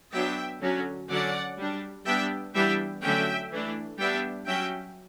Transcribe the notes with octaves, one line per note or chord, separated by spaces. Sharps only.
F#3 B3 D4 E5 G5
D3 F#3 C#4
D3 F#3 C#4 D5 F#5
G3 D4
G3 B3 D4 E5 G5
E3 G3 B3 D4 E5 G5
D3 F#3 A3 C#4 E5 G5
E3 A3 D4
G3 B3 D4 E5 G5
F#3 C#4 E5 G5